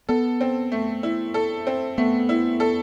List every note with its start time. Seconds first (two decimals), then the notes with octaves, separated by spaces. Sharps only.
0.09 B3 A4
0.41 C4
0.72 A3
1.03 E4
1.34 A4
1.67 C4
1.98 A3 B3
2.29 E4
2.60 A4